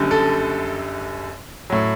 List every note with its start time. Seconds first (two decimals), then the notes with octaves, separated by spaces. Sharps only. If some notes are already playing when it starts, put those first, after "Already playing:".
Already playing: F#1 F#2 D3 G3
0.11 A4
1.70 A2 F#3